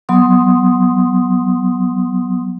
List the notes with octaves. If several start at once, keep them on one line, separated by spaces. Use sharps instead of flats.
F#3 B3 C6 D#6